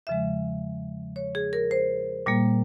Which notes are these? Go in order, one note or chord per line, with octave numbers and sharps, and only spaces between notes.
E2 C#3 F3 G#3 E5
C#5
G#4
A#4
C5
A#2 G3 A#3